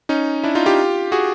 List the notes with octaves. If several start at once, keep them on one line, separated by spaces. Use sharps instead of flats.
C#4 D#4
D4 E4
D#4 F4
F4 G4
F#4 G#4